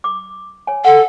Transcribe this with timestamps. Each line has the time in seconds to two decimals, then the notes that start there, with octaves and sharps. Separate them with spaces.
0.04 D6
0.67 C#5 G#5
0.85 A4 F#5